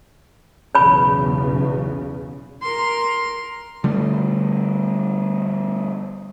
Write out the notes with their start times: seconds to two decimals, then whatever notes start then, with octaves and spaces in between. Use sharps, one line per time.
0.75 B1 E2 C#3 C#5 B5
2.62 A#4 C6
3.84 D3 G3 A3